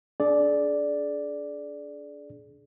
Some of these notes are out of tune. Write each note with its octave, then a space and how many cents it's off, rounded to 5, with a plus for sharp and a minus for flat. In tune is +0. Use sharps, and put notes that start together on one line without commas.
D4 -20 G#4 +35 D5 +0